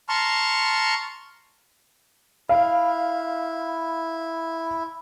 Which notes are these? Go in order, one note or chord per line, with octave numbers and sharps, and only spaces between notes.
A5 A#5 C6 C#6 F6
E4 F5